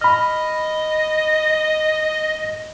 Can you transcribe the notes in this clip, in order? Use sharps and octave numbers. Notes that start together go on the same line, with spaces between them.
D#5 B5 F6